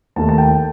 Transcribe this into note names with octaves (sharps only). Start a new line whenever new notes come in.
D#2 D#3 A3 A5
A5
G5